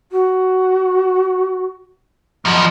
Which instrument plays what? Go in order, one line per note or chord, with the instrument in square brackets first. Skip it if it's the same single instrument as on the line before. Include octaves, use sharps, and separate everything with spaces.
[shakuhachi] F#4
[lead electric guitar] F#2 F3 [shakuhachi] D#5